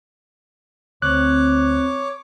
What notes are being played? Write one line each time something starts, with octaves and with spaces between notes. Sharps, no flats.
D2 C4 C#5 D6 F#6